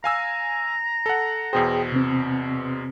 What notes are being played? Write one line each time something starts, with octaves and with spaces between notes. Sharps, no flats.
F5 G#5 A#5 E6
A4 F#5
E2 B2 G#4 C5 G5 D#6
C3 C4